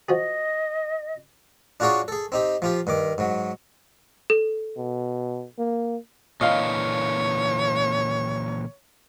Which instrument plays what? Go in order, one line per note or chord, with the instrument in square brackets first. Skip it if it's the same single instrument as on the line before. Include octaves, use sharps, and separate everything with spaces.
[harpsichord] F3 F#4 G#4 [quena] D#5
[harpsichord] D4 F4 F#4 G#4 C#5 D5
G#4 A4
C4 D#4 G4
F3 F4 G4
G2 D#3 D6
G#2 F#3
[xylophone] A4
[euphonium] B2
A#3
[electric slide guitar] A#2 D3 E3 [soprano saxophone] C#5 [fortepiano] D#5 F5